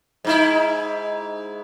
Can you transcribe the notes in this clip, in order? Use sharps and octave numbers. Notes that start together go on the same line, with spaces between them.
G#2 D#4 E4